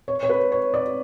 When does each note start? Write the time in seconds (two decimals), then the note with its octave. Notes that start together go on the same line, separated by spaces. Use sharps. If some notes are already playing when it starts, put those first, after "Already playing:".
0.08 C#5
0.23 C#5
0.29 B4
0.52 C#5
0.74 D5